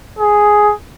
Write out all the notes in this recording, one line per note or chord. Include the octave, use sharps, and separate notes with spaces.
G#4